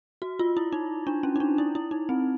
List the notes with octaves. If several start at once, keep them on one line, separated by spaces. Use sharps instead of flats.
F#4
F4
E4
D#4
D4
C#4
D#4
D4
E4
E4
D#4
C4